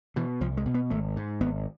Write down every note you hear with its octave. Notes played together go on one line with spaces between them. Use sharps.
B2 E3
C2 F3
G#3
B2
B3
G#1 A3
G#2
G#1 B3